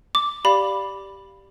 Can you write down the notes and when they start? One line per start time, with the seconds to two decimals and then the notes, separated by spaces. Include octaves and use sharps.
0.15 D6
0.45 G4 D5 F5 B5